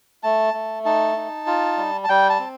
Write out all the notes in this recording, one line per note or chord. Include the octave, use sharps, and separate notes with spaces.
A3 A5
A3
D#4 A5
D#4
F4
G3
A5
G3 G5
A5
C4